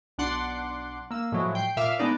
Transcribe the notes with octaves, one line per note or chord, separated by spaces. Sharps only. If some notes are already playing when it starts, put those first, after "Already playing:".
B1 D4 F#5 C6 D6
A#3 E6
A2 F3 F#3 G#3
G5 C7
A#2 E5 F5 D6
G#3 B3 D4 D#4 D5